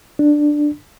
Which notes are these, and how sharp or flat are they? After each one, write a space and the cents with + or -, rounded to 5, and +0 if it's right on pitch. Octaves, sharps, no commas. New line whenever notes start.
D4 +5